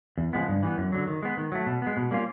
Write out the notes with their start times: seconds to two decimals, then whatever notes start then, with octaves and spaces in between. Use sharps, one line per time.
0.18 E2
0.33 C#3 F3 G#3 B3
0.48 G2
0.63 E3 G3 B3
0.78 F#2
0.92 D3 F#3
1.07 D#3
1.23 G#3 B3
1.37 D#3
1.52 F#3 A3
1.66 B2
1.82 G#3 B3
1.97 B2
2.11 G3 A#3 C#4 F4